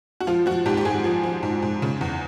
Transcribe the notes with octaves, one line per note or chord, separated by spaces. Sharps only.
F#4
F3 F4
F3 F#4
G#2 G4
G4
G#2 G#4
F3
F3
G#2
G#2
C#3
E2